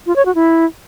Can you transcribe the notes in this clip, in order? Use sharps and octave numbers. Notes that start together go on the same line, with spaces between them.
F4
C#5
F#4
E4